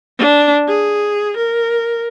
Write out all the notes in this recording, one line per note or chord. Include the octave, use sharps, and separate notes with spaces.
D4
G#4
A#4